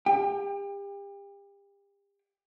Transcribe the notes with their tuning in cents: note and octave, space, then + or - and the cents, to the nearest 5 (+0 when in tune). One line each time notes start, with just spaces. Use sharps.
G4 +35 G5 +25